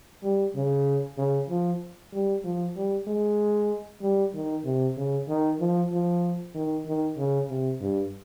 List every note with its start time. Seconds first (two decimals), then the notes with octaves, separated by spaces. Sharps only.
0.23 G3
0.55 C#3
1.18 C#3
1.50 F3
2.13 G3
2.44 F3
2.76 G3
3.07 G#3
4.02 G3
4.34 D#3
4.65 C3
4.97 C#3
5.28 D#3
5.60 F3
5.92 F3
6.55 D#3
6.86 D#3
7.18 C#3
7.49 C3
7.81 G2